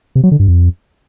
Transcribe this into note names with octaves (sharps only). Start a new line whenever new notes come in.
C3
F#3
D3
G2
F2